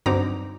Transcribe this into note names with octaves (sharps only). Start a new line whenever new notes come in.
G2 D3 F#3 C4 D#4 A#5 D6